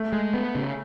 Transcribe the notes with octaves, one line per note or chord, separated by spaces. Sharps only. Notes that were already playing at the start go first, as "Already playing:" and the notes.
Already playing: A3
G#3
B3
C#3